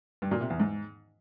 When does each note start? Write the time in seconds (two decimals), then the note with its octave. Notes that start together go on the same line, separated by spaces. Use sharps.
0.22 G2
0.31 A#2
0.41 C3
0.50 E2
0.60 G#2